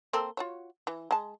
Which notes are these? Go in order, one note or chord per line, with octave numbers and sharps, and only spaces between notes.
A#3 C4 A4
F4 F#4 C#5
E3
G#3 A5